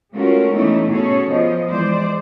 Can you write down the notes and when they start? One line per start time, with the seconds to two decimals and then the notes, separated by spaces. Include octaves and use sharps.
0.13 G#3 A3 C#4 F4 F#4 A#4
0.54 E3 A3 B3 C#4 D#4 E4
0.89 B2 C#4 F#4 G#4 A4 C#5
1.26 F3 B3 D#5
1.71 E3 G#3 C5 D5